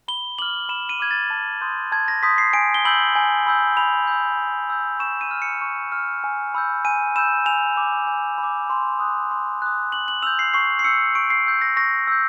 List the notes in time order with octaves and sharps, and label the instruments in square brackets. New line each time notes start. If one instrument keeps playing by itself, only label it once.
[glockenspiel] B5 G7
D6 F6 F#7
B5 E7
D#7
D6 F6 G#6
A6
A5
C6 D#6 G6
A5 G#6
A#6
C6 D#6 G6 B6
C7
G#5 D7
G7
B5 E6 G6 F#7
G#5
B5 E6 G6
B5 F7
E6 G6
B5
E6 G6
C#6 E7
D#7
F6
C#7
C#6
F6
G#5
B5 E6 G6
G#5 D#7
B5 E6 G6 E7
G#5 F7
B5 D6
G#5
B5
D6
C6
D#6 F#6
C6
D#6 F#6
C#6 F#7
F#7
E6 G6 F7
C7
C#6 C7
C7
E6 G6 C#7
C#6 D7
C7
E6 G6
A#6
C#6 A#6
E6 G6